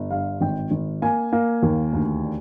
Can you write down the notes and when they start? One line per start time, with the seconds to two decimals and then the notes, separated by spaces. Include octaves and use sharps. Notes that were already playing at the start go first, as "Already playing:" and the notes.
Already playing: G1
0.11 G2 F5
0.41 G#1 G5
0.71 G#1
1.02 A#3 G#5
1.33 A#3
1.63 D#2
1.93 D2
2.23 D4